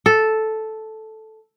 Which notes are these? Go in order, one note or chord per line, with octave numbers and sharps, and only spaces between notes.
A4